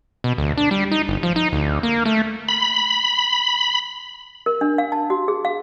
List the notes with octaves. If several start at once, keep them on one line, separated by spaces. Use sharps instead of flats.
B2
D2
D4
G3
D#4
G1
F3
D#4
D2
A#3
A3
B5
A#4
D4
F5
A5
F#4
G#4
F5